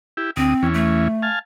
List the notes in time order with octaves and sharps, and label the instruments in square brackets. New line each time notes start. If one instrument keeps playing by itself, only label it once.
[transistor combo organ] E4 G4
[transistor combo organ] D2 D#6 [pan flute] C4
[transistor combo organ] E2 E3 C#4
[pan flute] A3
[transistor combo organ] F5 G#5 A5